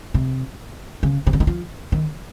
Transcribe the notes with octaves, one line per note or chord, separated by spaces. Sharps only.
C3
C#3
C3
C#3
D#3
F3
D#3